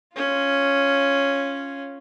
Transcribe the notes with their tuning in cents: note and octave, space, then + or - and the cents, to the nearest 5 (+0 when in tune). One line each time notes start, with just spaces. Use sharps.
C#4 +0 F4 -5